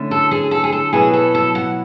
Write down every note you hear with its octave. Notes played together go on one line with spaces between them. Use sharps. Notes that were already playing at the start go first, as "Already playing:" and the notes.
Already playing: D3 A3 C#4 E4
A4
G#4
A4
G#4
A4
B2 F#3 B3 E4 G#4
A4
A4
F#5